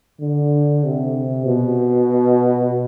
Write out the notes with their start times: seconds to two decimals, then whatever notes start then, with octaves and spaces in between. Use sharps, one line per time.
0.21 D3
0.84 C3
1.46 B2